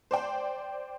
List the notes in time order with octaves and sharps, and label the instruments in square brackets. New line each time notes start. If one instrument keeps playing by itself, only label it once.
[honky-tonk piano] C5 D5 G5